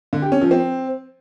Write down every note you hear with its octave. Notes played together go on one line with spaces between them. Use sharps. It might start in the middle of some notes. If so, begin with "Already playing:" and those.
D3
G4
C#4
F3
C4